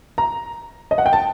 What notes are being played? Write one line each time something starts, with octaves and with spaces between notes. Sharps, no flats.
A#5
D#5
F#5
G5
A5